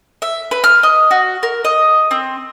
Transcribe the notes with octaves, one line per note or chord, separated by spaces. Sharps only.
E5
B4
F6
D#5
F#4
A#4
D#5
C4